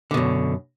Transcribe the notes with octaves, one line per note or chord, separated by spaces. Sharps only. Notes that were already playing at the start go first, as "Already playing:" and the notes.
F#2 B2 D3